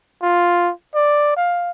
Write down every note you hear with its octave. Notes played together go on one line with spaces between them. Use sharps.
F4
D5
F5